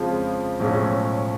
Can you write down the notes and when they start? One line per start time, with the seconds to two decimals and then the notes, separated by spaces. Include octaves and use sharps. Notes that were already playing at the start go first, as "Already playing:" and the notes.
Already playing: F2 C#3 F3 G#3
0.60 B1 A2 F3 G#3 C#4